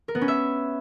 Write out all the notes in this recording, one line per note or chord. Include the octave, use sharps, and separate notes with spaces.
A#4
B3
C#4
E5